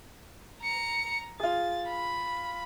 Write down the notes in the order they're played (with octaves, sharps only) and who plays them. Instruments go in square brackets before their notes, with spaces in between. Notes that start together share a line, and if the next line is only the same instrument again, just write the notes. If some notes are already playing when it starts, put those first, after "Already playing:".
[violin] A#5 C#7
[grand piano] F4 G#4 [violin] A6
[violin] B5